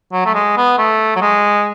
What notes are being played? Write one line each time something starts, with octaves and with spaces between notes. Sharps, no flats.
F#3
A3
G#3
B3
A3
F#3
G#3